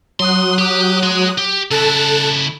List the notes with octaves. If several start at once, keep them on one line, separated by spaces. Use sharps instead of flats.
F#3 C6 D#6 F#6
G4
G#4 C6
G4
C#3 E4 A4 A5 F#6